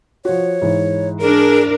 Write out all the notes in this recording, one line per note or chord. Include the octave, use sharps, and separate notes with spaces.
F3 F#4 C#5
G#2 E3
D4 G#4 A#4